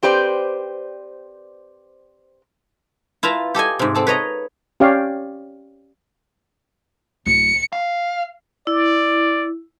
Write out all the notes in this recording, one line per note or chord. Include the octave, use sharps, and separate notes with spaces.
C4 G4 B4 C5 D5
E4 F4 B4 A5 A#5
G4 A4 D#5 G#5
G#2 C3
C4 A4 A5
B4 C#5 D#5 A#5
C#4 G4 C#5 D5 F5
D1 C#7
F5
E4 D5